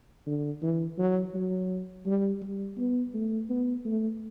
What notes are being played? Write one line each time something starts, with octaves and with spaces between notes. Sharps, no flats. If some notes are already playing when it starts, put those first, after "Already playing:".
D3
E3
F#3
F#3
G3
G3
B3
A3
B3
A3